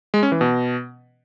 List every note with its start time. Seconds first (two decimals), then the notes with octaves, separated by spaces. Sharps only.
0.14 G#3
0.23 C#4
0.32 E3
0.41 B2